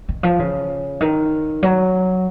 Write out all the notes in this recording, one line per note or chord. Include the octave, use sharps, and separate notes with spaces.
D#3
F3
C#3
D#3
F#3